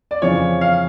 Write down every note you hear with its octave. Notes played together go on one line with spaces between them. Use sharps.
D5
F2 C#3 E3 C#5
F5